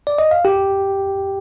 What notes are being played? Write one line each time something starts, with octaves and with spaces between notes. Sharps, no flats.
D5
D#5
F5
G4 G5